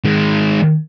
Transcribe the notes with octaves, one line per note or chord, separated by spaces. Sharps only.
D#3 G#3